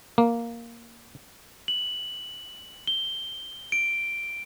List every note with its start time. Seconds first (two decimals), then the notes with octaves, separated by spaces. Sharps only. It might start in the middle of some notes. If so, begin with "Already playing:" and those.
0.18 A#3
1.68 F#7
2.87 G7
3.72 D7